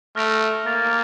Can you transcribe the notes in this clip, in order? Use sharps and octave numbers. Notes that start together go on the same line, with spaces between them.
A3 F6 A#6 D7 F7
A#3 A6 D7 F7